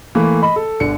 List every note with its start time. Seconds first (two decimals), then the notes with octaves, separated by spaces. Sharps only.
0.15 E3 A3 A#3
0.42 D#5 B5
0.56 A4
0.80 G1 D3 C#7